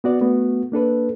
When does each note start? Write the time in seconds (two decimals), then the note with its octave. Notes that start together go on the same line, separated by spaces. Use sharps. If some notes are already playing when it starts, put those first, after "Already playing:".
0.04 B3 F#4 D5
0.21 A3 B3 F#4
0.72 A#3 D4 A4 B4